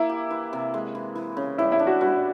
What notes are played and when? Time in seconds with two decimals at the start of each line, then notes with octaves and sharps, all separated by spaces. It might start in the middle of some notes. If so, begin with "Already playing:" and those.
Already playing: A#3 E4
0.09 G4
0.30 E3
0.53 C3
0.74 G#3
0.95 E3
1.15 E3
1.37 C#3
1.58 G3 E4
1.72 E4
1.79 D4
1.87 F#4
2.01 G3 F#4